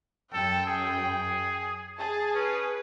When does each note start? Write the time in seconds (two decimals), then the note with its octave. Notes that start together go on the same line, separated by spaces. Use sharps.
0.34 F#2 A4 G5
0.66 G#4
1.98 G#4 A5
2.36 C#4 B4